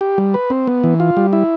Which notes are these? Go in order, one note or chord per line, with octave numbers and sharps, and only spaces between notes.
G4
G3
B4
C4
B3
E3
F4
G3
E4